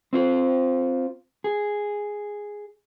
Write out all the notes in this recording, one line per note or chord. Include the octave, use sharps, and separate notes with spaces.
C4 F4 C5
G#4